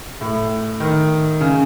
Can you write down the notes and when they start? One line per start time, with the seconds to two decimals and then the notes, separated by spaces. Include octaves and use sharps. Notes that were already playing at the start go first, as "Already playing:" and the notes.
0.21 A2
0.80 D#3
1.41 C#3